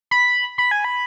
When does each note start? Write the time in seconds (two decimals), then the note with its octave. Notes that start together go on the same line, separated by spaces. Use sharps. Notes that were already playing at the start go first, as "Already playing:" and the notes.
0.11 B5
0.58 B5
0.71 G#5
0.85 B5